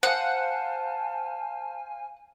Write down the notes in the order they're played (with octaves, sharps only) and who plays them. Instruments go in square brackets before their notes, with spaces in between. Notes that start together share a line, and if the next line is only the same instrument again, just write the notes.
[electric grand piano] C5 F5 [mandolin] F#5 [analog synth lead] G#5 [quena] A5